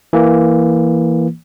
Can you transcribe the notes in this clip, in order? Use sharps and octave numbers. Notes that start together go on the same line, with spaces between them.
E3 A#3